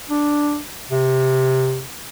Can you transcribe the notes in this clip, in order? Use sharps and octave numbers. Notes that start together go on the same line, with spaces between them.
D4
C3